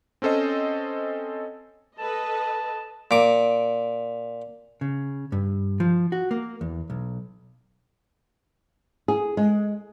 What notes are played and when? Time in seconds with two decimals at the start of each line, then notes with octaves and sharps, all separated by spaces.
0.22 C4 C#4 A4 C5 D#5
1.99 A4 B4 D#5 A5
3.11 A#2 D6
4.81 C#3
5.32 G2
5.80 F3
6.12 F#4
6.31 A#3
6.61 E2
6.90 B1
9.08 G#4
9.37 G#3